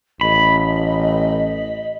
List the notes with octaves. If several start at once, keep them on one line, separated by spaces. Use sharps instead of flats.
A1 D#5 B5